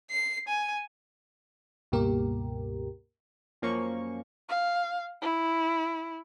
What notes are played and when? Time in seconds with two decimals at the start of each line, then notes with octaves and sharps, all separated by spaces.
0.10 C7
0.48 G#5
1.92 C#2 G2 B2 A#3 G4 A#4
3.62 F#2 F3 A#3 C#4 C#6
4.49 F5
5.22 E4